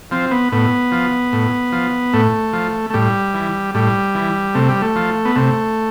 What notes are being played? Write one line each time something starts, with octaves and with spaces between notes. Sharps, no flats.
F3 C4
B3
A2 B3
F3
A2
F3
A2 A3
F3
A3
A2 G3
E3
A2 G3
E3
C3 A3
G3
A3
F3
B3
C3 A3